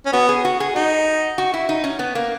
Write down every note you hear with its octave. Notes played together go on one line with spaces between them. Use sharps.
C#4
B3 F#4
G#4
F#4
G#4
D#4 F#4
F#4
E4
D#4
C#4
B3
A#3